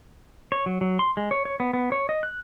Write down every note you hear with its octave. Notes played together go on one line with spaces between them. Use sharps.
C#5
F#3
F#3
C6
G#3
C#5
C#5
B3
B3
C#5
D#5
F#6